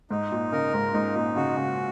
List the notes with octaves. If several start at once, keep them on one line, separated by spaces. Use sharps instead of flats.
G#2 D#4
A#2
C#3 A#4
G#2
G#2 D#4
A#2
C#3 F#4
C#3